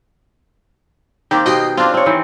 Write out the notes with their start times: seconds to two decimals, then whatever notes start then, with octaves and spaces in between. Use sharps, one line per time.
1.31 D#3 A#3 C4 G4
1.46 B2 G4 D#5 G5 C7
1.77 C4 D4 F4
1.94 C4 C#5
2.06 D#3 E3 C4